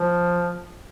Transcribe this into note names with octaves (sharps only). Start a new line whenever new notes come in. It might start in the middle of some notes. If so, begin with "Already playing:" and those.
Already playing: F3